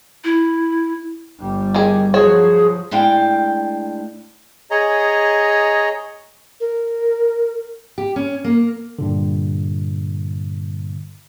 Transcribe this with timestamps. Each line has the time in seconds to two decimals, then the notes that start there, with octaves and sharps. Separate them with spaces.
0.25 E4
1.39 G1 G3
1.75 D#3 G#4
2.14 F3 F#3 F#4 G#4 C#5
2.91 A2 G#3 D4 F5 G5
4.71 G#4 C#5 D#5 A#5
6.60 A#4
7.98 G4
8.16 C#4
8.44 A#3
8.99 G2 A#2 D3